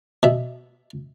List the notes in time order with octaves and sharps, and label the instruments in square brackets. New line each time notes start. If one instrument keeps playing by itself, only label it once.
[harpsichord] B2 E5